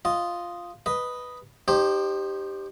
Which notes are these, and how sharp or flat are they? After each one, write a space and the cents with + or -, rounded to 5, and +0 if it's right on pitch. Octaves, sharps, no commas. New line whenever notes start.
F4 +0 D#5 +0
B4 +0 D#5 +0
D#4 -30 G4 +0 C5 +15